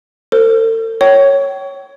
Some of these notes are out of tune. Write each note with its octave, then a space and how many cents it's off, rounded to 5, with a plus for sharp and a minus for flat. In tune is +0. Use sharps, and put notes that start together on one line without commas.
A4 +45 C5 +0
C#5 +0 G5 -35 C#6 +25